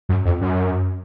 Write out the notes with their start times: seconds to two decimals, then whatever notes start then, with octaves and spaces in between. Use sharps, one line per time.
0.09 F#2
0.25 F2
0.41 F#2